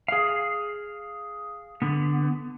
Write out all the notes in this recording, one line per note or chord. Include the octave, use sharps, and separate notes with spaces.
G#4 F5
D3 B3